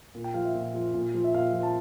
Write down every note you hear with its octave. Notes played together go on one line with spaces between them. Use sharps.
A#2
G5
F3 F5
E5
A#2
F3
A#2
F3
E5
A#2 F5
F3
A5